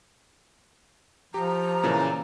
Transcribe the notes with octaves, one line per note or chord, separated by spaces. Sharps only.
F3 G4 A#5
A#2 C#3 E3